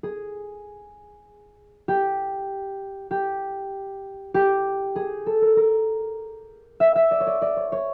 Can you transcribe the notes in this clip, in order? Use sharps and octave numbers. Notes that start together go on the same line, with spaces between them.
G#4
G4
G4
G4
G#4
A4
A#4
A#4
E5
E5
D5
C#5
D5
D5
C#5
C#5